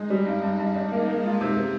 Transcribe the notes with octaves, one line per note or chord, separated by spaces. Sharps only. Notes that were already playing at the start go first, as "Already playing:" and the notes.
Already playing: G#3 D#4
G3
G2
G2
G2
G#3 D4
A#3
A#3
F4
C3 G#3
C3